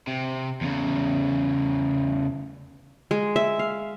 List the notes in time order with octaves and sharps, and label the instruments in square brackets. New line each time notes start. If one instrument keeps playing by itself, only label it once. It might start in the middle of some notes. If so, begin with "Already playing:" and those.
[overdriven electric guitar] C3
E2 C#3
[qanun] G#3
E5
F5